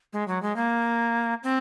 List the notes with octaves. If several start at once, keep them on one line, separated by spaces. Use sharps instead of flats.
G#3
F#3
G#3
A#3
C4